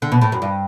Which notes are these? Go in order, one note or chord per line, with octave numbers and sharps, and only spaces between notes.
D3
B2
A2
F#2
G2